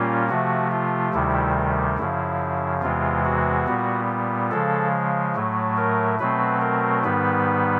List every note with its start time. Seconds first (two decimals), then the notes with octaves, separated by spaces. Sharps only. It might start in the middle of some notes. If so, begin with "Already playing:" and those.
Already playing: A#2 G3 A#3 C#4 F4
0.30 C3 F3 A3 F#4
0.71 F4
1.14 D2 C3 D#3 G3 E4
1.98 F#2 C#3 F3 E4
2.82 E2 C3 E3 G#3 F4
3.25 F#4
3.67 A#2 G3 B3
4.51 C#3 F3 G#3 A4
5.35 A2 F#3 A3
5.77 A#4
6.19 B2 F#3 A3 C4 B4
6.61 A#4
7.04 G#2 D#3 G3 B3 B4